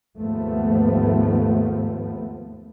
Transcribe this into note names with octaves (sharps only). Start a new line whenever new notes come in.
D#2 G#2 F3 A3 B3